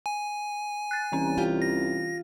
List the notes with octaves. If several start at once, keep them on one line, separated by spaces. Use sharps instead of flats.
G#5
F#6 A6
C2 E3 C#4
F4 G4 G5
A#6